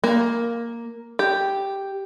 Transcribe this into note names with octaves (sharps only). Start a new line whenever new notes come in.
A#3
G4